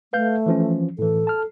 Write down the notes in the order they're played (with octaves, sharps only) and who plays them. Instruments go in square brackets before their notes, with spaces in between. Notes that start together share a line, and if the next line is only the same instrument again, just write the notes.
[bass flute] A3 [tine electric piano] B4 F5 G6
[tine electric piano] E3 F3 C#4
[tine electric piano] A2 E3 [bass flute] A4
[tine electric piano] A5 F6